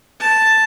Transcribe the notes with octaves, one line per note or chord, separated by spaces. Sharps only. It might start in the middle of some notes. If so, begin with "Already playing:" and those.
A5